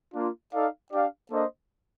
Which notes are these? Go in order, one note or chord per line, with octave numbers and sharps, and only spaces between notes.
A#3 D4 F4
D#4 A4 D5 F5
D4 G4 D5 F5
A#3 D4 A4 C5 D#5